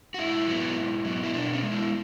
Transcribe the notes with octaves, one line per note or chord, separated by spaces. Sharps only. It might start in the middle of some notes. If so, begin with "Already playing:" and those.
F#4
G#2 E4
F#3
B3
G#2
F#3 B3
E4
B2 D4
C#4
G#3 B3
E4